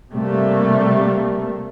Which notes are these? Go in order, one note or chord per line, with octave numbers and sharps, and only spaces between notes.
C3 G3 A3 A#3